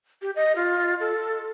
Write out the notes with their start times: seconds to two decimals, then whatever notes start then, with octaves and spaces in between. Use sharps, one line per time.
0.22 G4
0.36 D#5
0.56 F4
1.00 A4